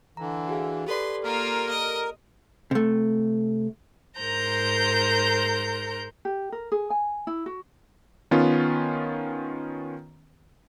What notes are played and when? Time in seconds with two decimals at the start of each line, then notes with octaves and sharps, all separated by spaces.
0.17 D3 E3 A#5
0.48 F#4 G#4 F5
0.87 G4 A4 B4 D5 C6
1.24 A#3 F4 A#4
1.69 D#5
2.71 C3 A3
4.19 G#2 A#4 C5 A#5 G6
6.25 G4
6.52 A#4
6.72 G#4
6.90 G#5
7.27 E4
7.46 F#4
8.31 D#3 B3 C#4 F4